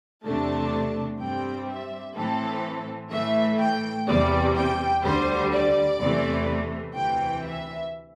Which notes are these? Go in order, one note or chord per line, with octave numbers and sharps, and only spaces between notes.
E2 C3 A3 D4 A5
G2 G3 C4 G5
E5
A2 E3 C4 A4
A2 E3 A3 E5
G5
E2 C3 G3 D5
G5
D2 D3 G3 C5
D5
E2 C3 E3 A3
D2 C3 E3 G5
E5